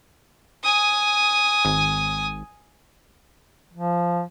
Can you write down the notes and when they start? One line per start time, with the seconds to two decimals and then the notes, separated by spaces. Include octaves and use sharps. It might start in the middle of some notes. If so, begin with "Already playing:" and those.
0.63 G#5 D#6
1.65 G#1
3.73 F3